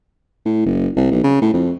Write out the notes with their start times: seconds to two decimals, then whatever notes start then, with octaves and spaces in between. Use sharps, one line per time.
0.46 A2
0.66 F#1
0.97 C2
1.11 B1
1.24 C#3
1.42 A2
1.54 F2